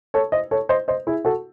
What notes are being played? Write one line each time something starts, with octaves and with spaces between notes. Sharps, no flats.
A4 C#5
C5 D#5
A4 C#5
C5 D#5
C5 D#5
E4 G#4
F#4 A4